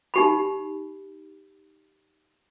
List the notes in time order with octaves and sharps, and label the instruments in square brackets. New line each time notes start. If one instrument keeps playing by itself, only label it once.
[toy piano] D#4 G4 B5